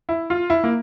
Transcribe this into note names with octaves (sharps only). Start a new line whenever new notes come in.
E4
F4
E4
A#3